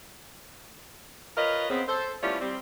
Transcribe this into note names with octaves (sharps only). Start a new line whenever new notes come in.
F4 A#4 B4 C#5 D#5
C#3 B3 C4
A4 C5
G3 A3 B3 C#4 E4 F4
G3 C4